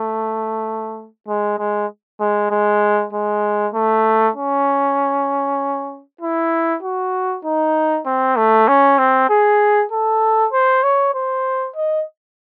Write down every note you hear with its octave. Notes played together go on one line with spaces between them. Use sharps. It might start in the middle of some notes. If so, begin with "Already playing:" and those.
Already playing: A3
G#3
G#3
G#3
G#3
G#3
A3
C#4
E4
F#4
D#4
C4
A3
C#4
C4
G#4
A4
C5
C#5
C5
D#5